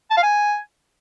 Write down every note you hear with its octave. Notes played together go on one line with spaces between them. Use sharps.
A5
F5
G#5